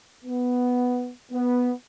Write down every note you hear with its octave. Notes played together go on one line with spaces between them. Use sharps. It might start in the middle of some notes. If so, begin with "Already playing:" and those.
B3
B3